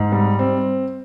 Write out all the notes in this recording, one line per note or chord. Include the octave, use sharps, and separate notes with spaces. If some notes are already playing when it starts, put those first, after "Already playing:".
Already playing: G#2
G3
C4